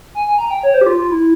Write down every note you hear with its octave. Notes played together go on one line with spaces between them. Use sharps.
G#5
G#5
A#5
G5
C#5
C5
G4
F4
F4
E4